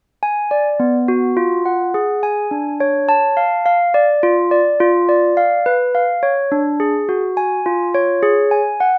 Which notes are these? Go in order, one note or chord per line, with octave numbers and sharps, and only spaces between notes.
G#5
D5
B3
F#4
F4
F#5
G#4
G#5
D4
C#5
A5
F5
F5
D5
F4
D5
F4
D5
F5
B4
F5
C#5
D4
G#4
F#4
G#5
F4
C#5
G#4
G#5
F#5